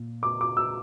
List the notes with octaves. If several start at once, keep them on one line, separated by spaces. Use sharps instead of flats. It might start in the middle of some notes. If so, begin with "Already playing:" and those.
Already playing: A#2
D6
D6
E6